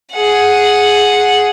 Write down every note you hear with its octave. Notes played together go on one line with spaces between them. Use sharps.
G#4 F#5